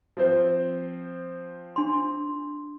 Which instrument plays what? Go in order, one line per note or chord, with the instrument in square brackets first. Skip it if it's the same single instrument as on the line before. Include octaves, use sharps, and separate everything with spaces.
[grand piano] F3 C4 C5
[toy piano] D4 C6